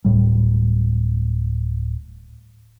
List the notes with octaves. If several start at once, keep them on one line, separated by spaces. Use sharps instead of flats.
D1 G#1 A2 G3